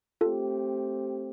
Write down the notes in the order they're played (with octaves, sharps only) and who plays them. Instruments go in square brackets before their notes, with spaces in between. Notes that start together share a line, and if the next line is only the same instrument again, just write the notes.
[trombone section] A3 C4 G4 [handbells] F4 A4